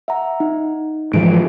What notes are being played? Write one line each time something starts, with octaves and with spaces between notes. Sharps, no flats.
E5 F#5 A#5
D#4
G#2 E3 F3 D7